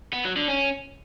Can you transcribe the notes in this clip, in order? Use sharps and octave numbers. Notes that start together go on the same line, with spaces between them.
B3
F#3
D3
C#4